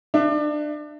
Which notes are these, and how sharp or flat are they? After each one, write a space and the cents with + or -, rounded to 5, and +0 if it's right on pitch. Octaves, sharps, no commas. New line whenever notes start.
D4 +25 E5 +20